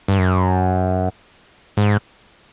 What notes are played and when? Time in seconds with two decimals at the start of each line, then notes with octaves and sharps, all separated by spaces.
0.08 G2
0.18 F#2
1.77 G#2